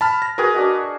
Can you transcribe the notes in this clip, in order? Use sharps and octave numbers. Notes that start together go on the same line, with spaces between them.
A5 B5 F6
A#6
F#4 G#4 A#4 B4
D4 F#4 D#5